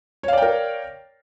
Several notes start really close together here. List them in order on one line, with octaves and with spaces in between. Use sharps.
C#5 F5 D5 G5 A#4